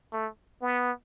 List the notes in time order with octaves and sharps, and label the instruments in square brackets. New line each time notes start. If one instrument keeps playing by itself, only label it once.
[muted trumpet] A3
B3